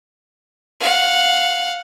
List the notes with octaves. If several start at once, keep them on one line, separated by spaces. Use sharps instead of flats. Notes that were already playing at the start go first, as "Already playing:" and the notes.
F5 F#5